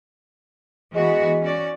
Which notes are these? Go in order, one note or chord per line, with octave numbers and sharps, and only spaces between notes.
E3 G#3 B3 F#4
C#4 F#4 D5